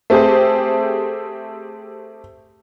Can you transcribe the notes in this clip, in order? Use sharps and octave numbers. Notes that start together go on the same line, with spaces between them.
A3 C4 G4 G#4 C5